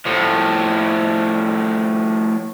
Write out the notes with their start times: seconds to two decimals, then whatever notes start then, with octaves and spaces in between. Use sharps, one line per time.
0.06 A2 F3